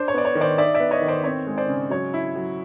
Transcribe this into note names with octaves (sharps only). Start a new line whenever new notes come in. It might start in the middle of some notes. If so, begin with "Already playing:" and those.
Already playing: D4 C5
C#5
B3 D5
C#5
D#3
C5 D5
D#4 D5 E5
D5 E5
B3
C#5 D#5
D#3
C5 D5
C4 C#5
G#3
C5 D5
C#3
F#3 C#5
E4
F#3